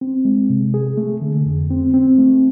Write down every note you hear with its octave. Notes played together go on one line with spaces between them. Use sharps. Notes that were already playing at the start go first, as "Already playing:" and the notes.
C4
G#3
C3
G#4
A3
D3
F2
C4
C4
A3